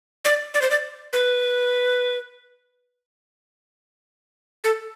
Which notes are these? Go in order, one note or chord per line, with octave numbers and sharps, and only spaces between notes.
D5
D5
C5
D5
B4
A4